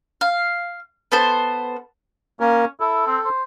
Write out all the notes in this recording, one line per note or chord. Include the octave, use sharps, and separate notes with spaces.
F5
B3 A4 C5
A#3 C#4 A#4
E4 A4
C4
C5